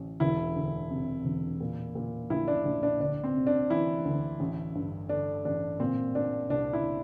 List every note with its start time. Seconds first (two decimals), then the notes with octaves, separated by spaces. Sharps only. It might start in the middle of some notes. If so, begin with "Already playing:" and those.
Already playing: A1
0.20 E1 E4
0.56 D2
0.91 C3
1.25 E1
1.61 A#2
1.95 A#2
2.30 A#1 E4
2.48 D4
2.65 A#1
2.83 D4
3.00 D2 D4
3.24 C4
3.35 C3
3.47 D4
3.70 E3 E4
4.05 D2
4.40 A1
4.75 G2
5.09 D3 D4
5.45 A1 D4
5.80 A#2 C4
6.15 A#2 D4
6.49 C2 D4
6.73 E4